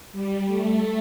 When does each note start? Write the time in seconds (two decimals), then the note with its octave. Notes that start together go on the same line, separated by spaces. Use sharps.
0.12 G3
0.46 A3